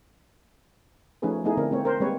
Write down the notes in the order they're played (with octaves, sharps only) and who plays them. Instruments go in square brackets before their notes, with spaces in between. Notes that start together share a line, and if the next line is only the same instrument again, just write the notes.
[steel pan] F3 A3 C#4 D#4 G#4 B4
A3 B3 D#4 E4 G#4
D3 A3 C4 D4 A#4
G#3 A#3 C4 C#5
A#4 C5
G3 G#3 A#3 C4 B4 C#5